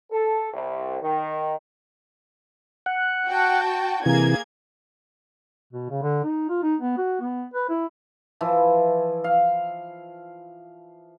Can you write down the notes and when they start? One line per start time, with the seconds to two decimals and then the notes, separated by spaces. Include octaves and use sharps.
0.11 A4
0.53 C2
1.01 D#3
2.86 F#5
3.27 F#4 G5 A5
4.06 C3 E3 A#3 G#4 G#6
5.73 B2
5.90 C#3
6.03 D3
6.24 D#4
6.49 F4
6.63 D#4
6.80 B3
6.98 F#4
7.21 B3
7.54 B4
7.70 E4
8.41 E3 F3 E4
9.24 F5